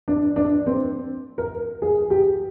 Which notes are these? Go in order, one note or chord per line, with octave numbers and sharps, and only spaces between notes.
D4
D4
C4
A#4
G#4
G4